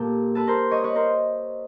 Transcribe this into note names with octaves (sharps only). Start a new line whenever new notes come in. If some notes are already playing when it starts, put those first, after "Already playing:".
Already playing: A#2 G4 A4
A4 B4
A#4 C5
C#5 D#5
B4 C#5
A#4 C5